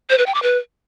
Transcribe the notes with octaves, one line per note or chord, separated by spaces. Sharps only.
C5
B4
G5
D6
B4